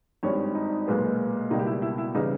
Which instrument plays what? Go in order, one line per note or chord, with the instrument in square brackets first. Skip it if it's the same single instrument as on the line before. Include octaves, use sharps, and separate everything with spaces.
[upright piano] G#1 G2 D#3 C#5
D#4
B1 A#2 G#3 B3
C#2 B2 G3 A#3 D#4
G4
E4
E4
E4
C#3 E3 G3 D#4